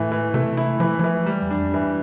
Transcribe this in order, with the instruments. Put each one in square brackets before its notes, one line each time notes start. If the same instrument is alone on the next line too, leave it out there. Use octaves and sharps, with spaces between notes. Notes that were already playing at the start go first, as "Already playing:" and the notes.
Already playing: [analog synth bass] A2 [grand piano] E3 A3 E4
[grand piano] E3
[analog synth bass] C3 [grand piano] A3
[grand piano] E4
[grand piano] E3 [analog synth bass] F3
[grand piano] E3 [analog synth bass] F3
[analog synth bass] E3 [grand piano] G3
[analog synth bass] E2
[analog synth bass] F2 [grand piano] D4
[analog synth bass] G2 [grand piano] E3